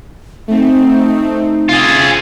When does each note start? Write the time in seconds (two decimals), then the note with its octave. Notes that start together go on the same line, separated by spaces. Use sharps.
0.48 A3 C4 D#4
1.69 C3 F4 G#4